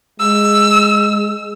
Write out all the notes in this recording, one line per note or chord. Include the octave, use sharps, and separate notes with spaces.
G#3 E6